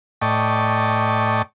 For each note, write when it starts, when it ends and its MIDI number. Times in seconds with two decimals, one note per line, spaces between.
0.22 1.42 45
0.22 1.42 74
0.22 1.42 75
0.22 1.42 79
0.22 1.42 81
0.22 1.42 85